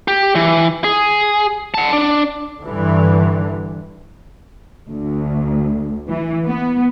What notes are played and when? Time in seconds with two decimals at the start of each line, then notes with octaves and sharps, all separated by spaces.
0.08 G4
0.35 E3
0.84 G#4
1.74 F#5 A5
1.92 D4
2.61 G2 D3 E3
4.90 D2
6.09 E3
6.45 B3